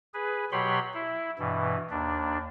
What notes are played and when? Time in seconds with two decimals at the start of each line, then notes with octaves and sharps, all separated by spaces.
0.14 G#4 B4
0.52 B2 F#3 G4 C#5 B5 C6
0.94 E4
1.39 G2 B2 E3
1.90 D#2 D4